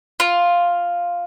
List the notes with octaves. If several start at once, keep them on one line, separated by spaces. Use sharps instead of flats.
F4